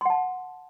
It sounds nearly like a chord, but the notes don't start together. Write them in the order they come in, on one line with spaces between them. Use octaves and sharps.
C6 F#5 A5